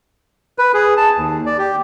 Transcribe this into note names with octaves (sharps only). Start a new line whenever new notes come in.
B4
G#4
A5
D#2
D5
G4